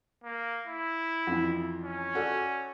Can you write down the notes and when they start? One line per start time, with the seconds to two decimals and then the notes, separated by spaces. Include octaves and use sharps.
0.24 A#3
0.67 E4
1.27 F2 E3
1.84 C#4
2.15 F#4 A4 D5